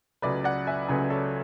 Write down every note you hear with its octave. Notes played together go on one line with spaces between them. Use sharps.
C#2 C#3 F#3 A3 B4 D5
D5 F#5
E5 G#5
C#2 C#3 F#3 A3 G#4 B4
A4 C#5